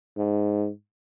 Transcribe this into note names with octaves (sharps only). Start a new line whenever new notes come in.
G#2